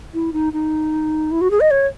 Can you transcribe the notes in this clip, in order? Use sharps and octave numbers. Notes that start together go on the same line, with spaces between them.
E4
D#4
D#4
E4
F#4
G#4
D#5
C#5